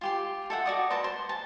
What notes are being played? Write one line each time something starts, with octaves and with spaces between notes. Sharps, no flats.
F4 G4 C6
A4 E5 F#5
F#4 D5 D#6
B4 C5 A5 A#5
C5
A5